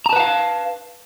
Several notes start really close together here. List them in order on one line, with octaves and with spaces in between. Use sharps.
A#5 A5 B4 F#5 F5